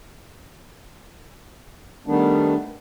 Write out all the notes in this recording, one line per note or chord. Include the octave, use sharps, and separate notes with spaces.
D#3 G3 A3 B3 D4